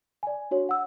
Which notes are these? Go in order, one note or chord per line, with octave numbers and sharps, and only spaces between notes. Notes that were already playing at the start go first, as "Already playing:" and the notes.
D5 G#5
D4 F#4 C#5
F#5 E6